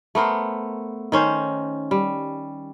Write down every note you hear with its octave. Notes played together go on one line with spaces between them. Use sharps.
A3 B3 A#4 C5
D#3 C#4 C5
G3